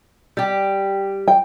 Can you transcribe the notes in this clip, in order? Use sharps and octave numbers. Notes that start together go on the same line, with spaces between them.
G3 G4
G5